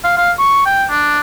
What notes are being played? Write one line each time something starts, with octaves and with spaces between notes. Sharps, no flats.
F5
F5
C#6
G5
D4